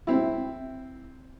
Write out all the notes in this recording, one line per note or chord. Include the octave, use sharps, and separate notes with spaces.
C4 E4